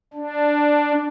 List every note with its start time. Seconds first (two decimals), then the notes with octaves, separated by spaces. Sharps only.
0.13 D4